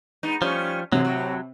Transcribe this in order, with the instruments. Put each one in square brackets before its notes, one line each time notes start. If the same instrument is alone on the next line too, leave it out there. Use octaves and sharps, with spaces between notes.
[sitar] G#3 B3 D#4
[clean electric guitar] F3 [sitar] G3 A3 C#4
[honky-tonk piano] C3 [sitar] E3 G#3 [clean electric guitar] F#3
[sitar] A2 F#4